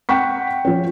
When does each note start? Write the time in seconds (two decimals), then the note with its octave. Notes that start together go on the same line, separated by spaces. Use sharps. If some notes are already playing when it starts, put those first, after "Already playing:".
0.09 F#5 G5 C#6 B6
0.65 F3 C#4